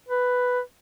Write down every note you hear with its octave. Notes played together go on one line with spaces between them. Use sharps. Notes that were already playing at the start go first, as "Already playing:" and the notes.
B4